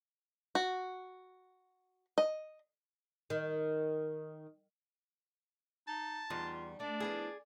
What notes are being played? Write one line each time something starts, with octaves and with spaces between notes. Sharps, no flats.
F#4
D#5
D#3
D#4 A5
E2 G3 D#4 F4
A3 D4 D5
F3 B3 E4 G#4